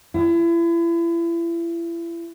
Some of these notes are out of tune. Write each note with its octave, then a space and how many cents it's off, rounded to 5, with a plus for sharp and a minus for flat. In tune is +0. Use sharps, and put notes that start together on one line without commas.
E4 +35